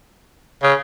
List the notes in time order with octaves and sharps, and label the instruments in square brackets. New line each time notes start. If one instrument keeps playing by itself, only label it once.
[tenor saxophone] C#3